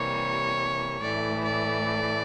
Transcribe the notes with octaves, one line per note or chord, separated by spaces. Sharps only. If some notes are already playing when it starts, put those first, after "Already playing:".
Already playing: C3 E3 G3 A#3 C#5
A2 E3 A3 D5
D5